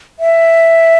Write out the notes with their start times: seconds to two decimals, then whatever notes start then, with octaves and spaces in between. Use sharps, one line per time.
0.19 E5